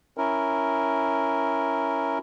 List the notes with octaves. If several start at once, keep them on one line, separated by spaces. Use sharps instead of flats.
C#4 E4 A#4